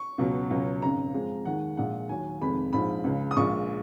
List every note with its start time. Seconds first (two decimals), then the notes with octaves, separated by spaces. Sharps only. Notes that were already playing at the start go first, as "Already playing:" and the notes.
Already playing: C#6
0.18 C#2 B2 F#3
0.50 C#2 B2 F#3
0.82 G#1 F#2 C#3 A#5
1.14 F2 F3 G#3
1.45 D#2 D#3 G#3 F#5
1.77 A#1 A#2 G#3 F#5
2.09 D#2 D#3 F#3 G#5
2.41 F1 F2 D#3 G#3 B5
2.73 A#1 G#2 F3 G#3 B5
3.04 C#2 C#3 G#3
3.31 D#6
3.37 A#1 A#2 G#3 C#6